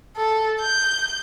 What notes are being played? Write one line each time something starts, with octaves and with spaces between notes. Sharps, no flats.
A4
G6